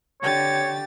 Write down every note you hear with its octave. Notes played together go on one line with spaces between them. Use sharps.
D3 G4 C#5 A6